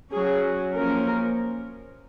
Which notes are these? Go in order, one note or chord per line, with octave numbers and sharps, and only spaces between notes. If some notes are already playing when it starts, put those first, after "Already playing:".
F#3 C#4 G#4
F3 A#3 C#4 A#4